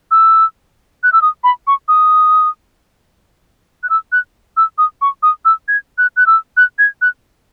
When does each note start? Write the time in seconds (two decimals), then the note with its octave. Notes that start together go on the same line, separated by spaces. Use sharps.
0.11 E6
1.03 F#6
1.13 E6
1.22 D#6
1.44 B5
1.67 C#6
1.88 D#6
3.83 F#6
3.90 E6
4.12 F#6
4.57 E6
4.78 D#6
5.01 C#6
5.23 D#6
5.45 E6
5.68 G#6
5.98 F#6
6.16 F#6
6.27 E6
6.57 F#6
6.79 G#6
7.02 F#6